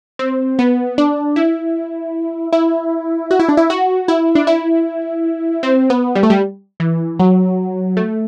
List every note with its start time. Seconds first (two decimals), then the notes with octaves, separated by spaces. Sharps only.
0.19 C4
0.59 B3
0.98 D4
1.36 E4
2.52 E4
3.31 F#4
3.39 E4
3.49 D4
3.57 E4
3.70 F#4
4.08 E4
4.35 D4
4.47 E4
5.63 C4
5.90 B3
6.15 G3
6.23 A3
6.30 G3
6.80 E3
7.19 F#3
7.97 A3